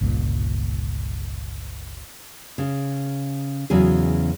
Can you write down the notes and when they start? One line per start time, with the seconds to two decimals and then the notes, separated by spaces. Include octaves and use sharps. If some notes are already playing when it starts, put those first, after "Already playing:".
0.01 G1 C#2 G2 A#2
2.58 C#3
3.70 E2 C#3 F#3 G#4